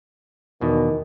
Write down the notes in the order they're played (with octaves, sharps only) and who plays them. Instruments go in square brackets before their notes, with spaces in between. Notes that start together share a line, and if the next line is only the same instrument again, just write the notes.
[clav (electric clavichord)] E2 B2 [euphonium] D#3